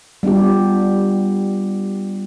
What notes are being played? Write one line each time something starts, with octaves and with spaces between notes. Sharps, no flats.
G3 B3 D4 F4 G4